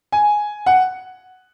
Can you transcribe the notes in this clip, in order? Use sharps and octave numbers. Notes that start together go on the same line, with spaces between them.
G#5
F#5